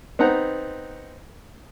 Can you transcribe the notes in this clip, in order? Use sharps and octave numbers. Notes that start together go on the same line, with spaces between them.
B3 C4 D#4 F#5 A#5